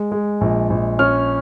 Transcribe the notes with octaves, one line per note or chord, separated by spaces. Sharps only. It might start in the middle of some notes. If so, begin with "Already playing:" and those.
Already playing: G#3
G#3
A#1
A#1
C#4 F6